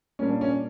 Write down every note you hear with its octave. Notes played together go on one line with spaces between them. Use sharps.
A#2 G3 A#3 C#4 D4
C#4